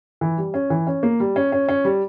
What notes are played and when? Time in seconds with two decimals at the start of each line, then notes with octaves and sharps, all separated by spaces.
0.21 E3
0.38 G3
0.54 C#4
0.70 E3
0.87 C#4
1.03 A#3
1.20 G3
1.36 C#4
1.52 C#4
1.69 C#4
1.85 G3